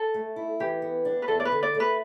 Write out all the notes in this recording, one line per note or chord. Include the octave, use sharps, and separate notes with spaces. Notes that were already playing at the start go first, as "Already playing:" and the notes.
Already playing: A4
A3
E4
E3 G4
B3
D4
B4
E2 A4
D5
B4
D3
D5
A3
B4